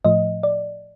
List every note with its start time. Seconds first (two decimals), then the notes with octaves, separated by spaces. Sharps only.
0.05 A2 F3 A3 D#5
0.43 D5